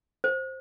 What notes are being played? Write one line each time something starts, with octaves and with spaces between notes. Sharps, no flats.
C5